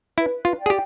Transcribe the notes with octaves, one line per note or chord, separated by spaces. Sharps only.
E4 B4
F4
D5 G5
G#4
G4